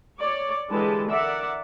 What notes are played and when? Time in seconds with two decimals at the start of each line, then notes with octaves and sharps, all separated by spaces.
0.19 C#5 D5
0.69 D3 E3 G#3 G4 B4 A5
1.08 A#4 D5 E5 F#5